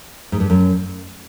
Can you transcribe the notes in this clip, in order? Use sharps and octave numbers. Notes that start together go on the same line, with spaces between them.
G#2
G2
F#2